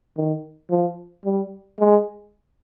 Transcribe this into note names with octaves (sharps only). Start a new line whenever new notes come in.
D#3
F3
G3
G#3